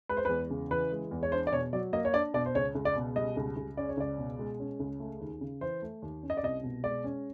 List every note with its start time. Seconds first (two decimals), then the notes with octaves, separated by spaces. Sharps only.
0.09 G#3 B4
0.17 C5
0.25 E2 B4
0.50 C#3
0.71 E3 B4
0.92 G#3
1.11 E2
1.23 C#5
1.32 D4 C5
1.47 D5
1.53 B2 C#5
1.73 F#3 D5
1.93 A#3 D#5
2.05 C#5
2.14 D4 D5
2.34 B2 D5
2.46 C5
2.55 C#2 C#5
2.75 C#2
2.85 D5
2.96 B2
3.16 G3 D#5
3.37 C#2
3.57 C#2
3.77 C#4 D5
3.89 C#5
3.97 C#2 D5
4.18 B2
4.39 G#3
4.60 C#4
4.80 C#2
5.00 A3
5.20 D#2
5.41 C#3
5.61 E3 C5
5.82 A3
6.02 D#2
6.23 C#4
6.30 D#5
6.37 D5
6.43 C2 D#5
6.63 B2
6.84 G#3 D5
7.04 C#4